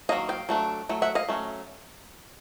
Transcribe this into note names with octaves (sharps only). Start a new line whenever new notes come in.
D#3 F#3 A#3 C#4 D#5 F5
F5 G5
F#3 A3 D4
F#3 A3
E5 F#5
D#5 F5
F#3 A3 C#4